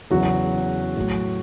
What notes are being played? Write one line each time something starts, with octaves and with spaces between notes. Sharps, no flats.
E2 C#3 E3 F#3 F#4
A2 F#3